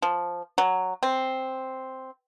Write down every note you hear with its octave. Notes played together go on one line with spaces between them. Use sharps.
F3
F#3
C4